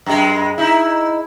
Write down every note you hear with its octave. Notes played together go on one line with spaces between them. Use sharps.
F#2 G#3
D#4 E4